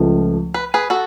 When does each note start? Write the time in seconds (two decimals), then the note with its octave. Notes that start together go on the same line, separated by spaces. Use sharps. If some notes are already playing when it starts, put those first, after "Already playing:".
Already playing: C#2 C#3 F3 A3
0.54 B4
0.74 G#4 B4
0.90 F#4 A4